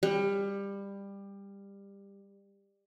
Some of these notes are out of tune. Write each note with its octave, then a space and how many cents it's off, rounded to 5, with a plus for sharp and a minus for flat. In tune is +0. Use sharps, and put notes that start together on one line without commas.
G3 +20